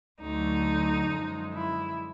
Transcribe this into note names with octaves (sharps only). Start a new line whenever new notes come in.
D2 D3 F#3 D#4
F#2 D3 F3 G#3
E4